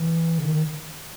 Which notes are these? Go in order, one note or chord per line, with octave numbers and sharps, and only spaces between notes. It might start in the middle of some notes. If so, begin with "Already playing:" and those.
Already playing: E3
C#3
D#3